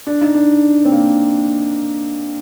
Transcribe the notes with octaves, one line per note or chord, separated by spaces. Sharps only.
D4
D#4
D4
C4
A#3